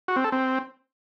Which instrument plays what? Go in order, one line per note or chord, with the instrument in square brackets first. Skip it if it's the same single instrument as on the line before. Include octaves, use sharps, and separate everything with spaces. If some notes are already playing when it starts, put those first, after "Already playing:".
[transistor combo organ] F#4
C4
A4
C4